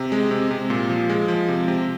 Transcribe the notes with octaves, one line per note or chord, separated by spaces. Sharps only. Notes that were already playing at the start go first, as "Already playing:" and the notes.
Already playing: C3
G#3
C3
C3
A#2
F3
G#3
F3
C3
C3